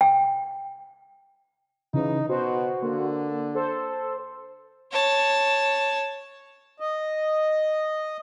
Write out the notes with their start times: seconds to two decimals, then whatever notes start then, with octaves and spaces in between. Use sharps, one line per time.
0.01 G5
1.94 C#3 E3 D#4
2.29 B2 F#4 C5
2.83 D3 A#3
3.55 A4 C5
4.91 C#5 A5
6.80 D#5